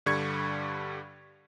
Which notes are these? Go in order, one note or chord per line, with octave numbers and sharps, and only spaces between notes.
G2 D3 G3 C#6 G#6 C#7